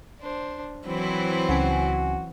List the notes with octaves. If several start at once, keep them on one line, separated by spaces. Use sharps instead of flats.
D4 C5
E3 F#3 C4 E4 C5
C#2 C#3 F#4 G#5